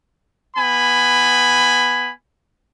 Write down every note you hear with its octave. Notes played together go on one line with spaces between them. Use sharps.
B3 G#5 B5